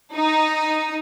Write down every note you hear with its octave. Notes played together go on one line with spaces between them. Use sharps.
D#4